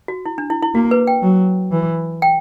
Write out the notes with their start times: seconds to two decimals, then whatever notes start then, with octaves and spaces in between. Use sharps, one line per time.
0.08 F#4
0.26 E4
0.38 D4
0.50 E4
0.63 E4
0.75 A#3 F#4
0.91 B4
1.07 G5
1.23 F#3
1.72 E3
2.22 G5